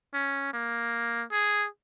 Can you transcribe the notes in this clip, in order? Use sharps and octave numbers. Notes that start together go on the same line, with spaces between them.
C#4
A#3
G#4